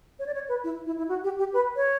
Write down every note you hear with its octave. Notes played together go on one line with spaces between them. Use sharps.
C#5
D5
C#5
B4
E4
E4
E4
F#4
G4
G4
B4
C#5